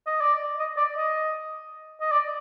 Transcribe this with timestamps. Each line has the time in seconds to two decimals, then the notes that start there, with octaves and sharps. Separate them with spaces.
0.07 D#5
0.21 D5
0.59 D#5
0.77 D5
0.97 D#5
2.01 D#5
2.12 D5